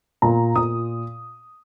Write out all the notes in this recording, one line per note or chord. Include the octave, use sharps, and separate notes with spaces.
A#2 A#5
A#2 D#6